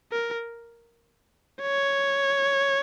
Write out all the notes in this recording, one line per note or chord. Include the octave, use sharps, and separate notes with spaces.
A#4
C#5